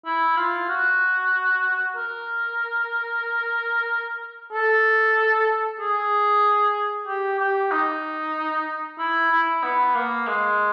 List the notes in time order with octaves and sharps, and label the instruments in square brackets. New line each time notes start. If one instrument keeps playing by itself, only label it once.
[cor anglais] E4
F4
F#4
A#4
A4
G#4
G4
G4
D#4
E4
E4
B3
A#3
G#3